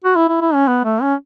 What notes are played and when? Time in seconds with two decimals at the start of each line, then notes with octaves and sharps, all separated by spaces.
0.04 F#4
0.16 E4
0.29 E4
0.41 E4
0.54 C#4
0.67 B3
0.84 A3
1.02 C#4